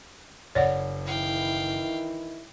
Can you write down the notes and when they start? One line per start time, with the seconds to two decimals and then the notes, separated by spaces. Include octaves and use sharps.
0.55 F#1 C#5 D5 F#5
1.06 D#3 E3 E4 F5 G5